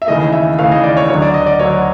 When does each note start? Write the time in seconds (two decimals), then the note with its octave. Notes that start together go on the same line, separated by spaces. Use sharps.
0.02 E5
0.07 D#2 C#3 E3 A3 D#5
0.32 E5
0.58 D#2 C#3 E3 A3 F5
0.72 D#5
0.84 D5
0.97 C#5
1.08 D2 D3 F#3 C#5
1.22 D5
1.34 D#5
1.46 D5
1.59 D2 D3 F#3 C#5